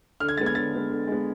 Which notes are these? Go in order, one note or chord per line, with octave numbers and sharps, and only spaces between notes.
D3 F6
G#6
G#3 B3 A6
G#6
D3 A6
G#3 B3
D3
G#3 B3